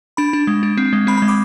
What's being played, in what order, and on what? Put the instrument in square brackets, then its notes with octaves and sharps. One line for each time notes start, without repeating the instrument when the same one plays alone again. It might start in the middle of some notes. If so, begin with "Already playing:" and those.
[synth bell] D4 B5
D4
G#3
D4
C4
G#3
C4 B5
B5
G#3
D6